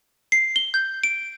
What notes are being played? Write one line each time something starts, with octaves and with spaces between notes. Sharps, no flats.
C7
G7
G6
D7